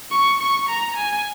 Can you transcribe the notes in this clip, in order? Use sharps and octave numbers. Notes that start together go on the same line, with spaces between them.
C#6
C#6
A#5
G#5